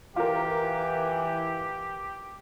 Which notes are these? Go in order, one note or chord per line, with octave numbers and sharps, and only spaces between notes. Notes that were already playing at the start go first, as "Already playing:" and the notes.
E3 F4 G4 A#4